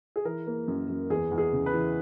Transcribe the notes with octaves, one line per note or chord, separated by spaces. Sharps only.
G#4
E3 A#4
A#3
F#2
F#2
E2 G#4
E2
G#4
C#3
B4
E3